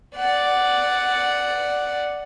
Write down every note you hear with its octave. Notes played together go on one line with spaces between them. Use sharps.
D5 F#5